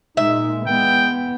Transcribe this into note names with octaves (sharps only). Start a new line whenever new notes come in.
A#2 G#3 D#4 E5
E3 G#3 B3 G5